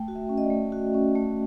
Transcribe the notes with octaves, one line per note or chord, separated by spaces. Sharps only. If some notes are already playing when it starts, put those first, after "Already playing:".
Already playing: A3 G5
F#4
E5
C#4
D#5
D5
A3
F#4
C#4
A3